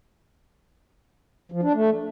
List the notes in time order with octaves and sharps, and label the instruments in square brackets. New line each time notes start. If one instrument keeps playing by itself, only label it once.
[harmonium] F3
D4
A3